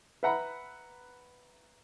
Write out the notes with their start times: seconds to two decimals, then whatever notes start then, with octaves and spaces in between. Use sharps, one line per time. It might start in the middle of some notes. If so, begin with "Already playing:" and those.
0.23 B4 E5 F#5 A#5 B5